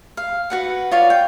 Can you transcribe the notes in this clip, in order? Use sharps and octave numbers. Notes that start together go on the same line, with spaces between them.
F5
F#4 B4 F#5
F4 C#5 D5 F5
G5